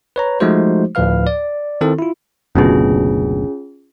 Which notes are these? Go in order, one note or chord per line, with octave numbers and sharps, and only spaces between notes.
B4 C#5 A#5
F3 G#3 A3 D#4 F#4 C5
D2 A2 F3 B4 F5 F6
D5
D#3 C4 E4 A4
E4 F4
F#1 D2 B2 C#4 F4 G#4